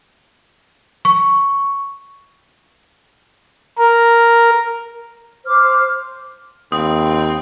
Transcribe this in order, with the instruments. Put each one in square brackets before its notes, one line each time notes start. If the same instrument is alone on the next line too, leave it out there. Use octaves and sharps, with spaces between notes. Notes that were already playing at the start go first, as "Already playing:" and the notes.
[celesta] C#6
[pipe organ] A#4
[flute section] C5 D6 F6
[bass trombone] D#2 [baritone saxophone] C4 [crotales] D#6